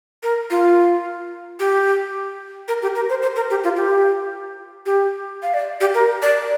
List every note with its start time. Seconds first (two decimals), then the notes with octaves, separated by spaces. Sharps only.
0.23 A#4
0.50 F4
1.60 G4
2.68 A#4
2.82 G4
2.96 A#4
3.09 C5
3.22 C5
3.36 A#4
3.50 G4
3.64 F4
3.76 G4
4.86 G4
5.42 F5
5.54 D5
5.81 G4
5.94 A#4
6.22 D5